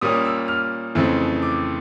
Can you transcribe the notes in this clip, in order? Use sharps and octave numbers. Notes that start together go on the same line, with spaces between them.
A#2 G3 A#3 C#4 D#6
E6
F6
F2 C#3 E3 A3 C4
D6